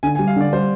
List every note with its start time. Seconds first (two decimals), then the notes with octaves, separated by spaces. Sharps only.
0.03 D3 G#5
0.15 G#5
0.19 G3
0.27 F5
0.36 D3 D5
0.53 G3 C5